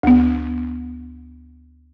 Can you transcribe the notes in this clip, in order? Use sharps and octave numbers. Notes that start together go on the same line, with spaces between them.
D2 B3